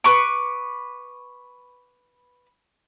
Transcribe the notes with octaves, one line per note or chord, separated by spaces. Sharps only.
B4 C#6 D6